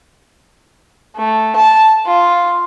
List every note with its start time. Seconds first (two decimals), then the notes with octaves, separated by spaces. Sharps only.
1.16 A3
1.56 A5
2.06 F4